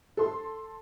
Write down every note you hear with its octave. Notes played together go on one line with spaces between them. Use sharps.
A4 C6